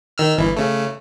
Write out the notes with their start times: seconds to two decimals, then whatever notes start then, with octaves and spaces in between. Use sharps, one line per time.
0.18 D#3 E6 F6
0.38 G1 E3
0.57 C#3 A3